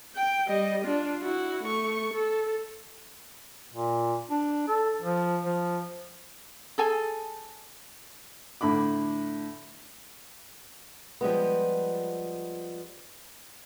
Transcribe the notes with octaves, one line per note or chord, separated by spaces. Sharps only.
G5
G3 D#5
D4 F4
E4 F#4
A3 C#6
A4
A#2
D4
A4
F3
F3
G#4 A4 G#5
A2 D3 B5 D6
F3 G3 G#3 B3